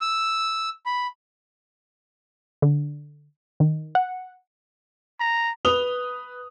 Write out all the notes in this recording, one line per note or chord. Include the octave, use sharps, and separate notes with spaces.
E6
B5
D3
D#3
F#5
A#5
B4 D#6 F7 G7